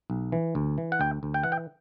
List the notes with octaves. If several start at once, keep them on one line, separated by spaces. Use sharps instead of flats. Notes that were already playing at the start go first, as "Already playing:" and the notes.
B1
E3
D2
E3
F#5
D2 G5
D2
G5
E3 F#5
G5